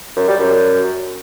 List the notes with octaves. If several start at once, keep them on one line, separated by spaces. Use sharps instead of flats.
F#2
G3
F#2